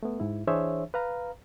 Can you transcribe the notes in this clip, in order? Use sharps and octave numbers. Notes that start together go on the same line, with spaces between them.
A3 B3
G#2 E4
E3 D4 G#4 C5 C#5 E5
B4 F5 A#5